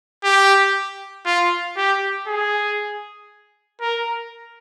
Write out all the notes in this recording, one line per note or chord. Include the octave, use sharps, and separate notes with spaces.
G4
F4
G4
G#4
A#4